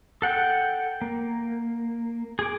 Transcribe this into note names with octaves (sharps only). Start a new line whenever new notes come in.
A4 F#5 G5
A#3
G#4 D6